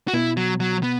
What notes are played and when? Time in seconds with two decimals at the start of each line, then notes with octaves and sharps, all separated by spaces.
0.08 F#4
0.13 B2 E4
0.37 F#3
0.60 F#3
0.83 B3